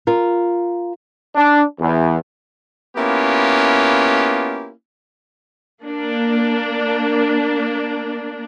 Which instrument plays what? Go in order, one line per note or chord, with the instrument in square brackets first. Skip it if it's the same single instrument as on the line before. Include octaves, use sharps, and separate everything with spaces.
[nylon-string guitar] F4 A#4
[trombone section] D4
E2
[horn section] A#3 B3 C#4 E4 F4 G4
[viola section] A#3 D4